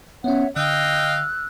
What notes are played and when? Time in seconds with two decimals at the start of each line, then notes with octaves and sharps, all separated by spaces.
0.24 B3 C#4 C#5 E5 F#5
0.56 D3 D#5 F5 G5 E6 F#6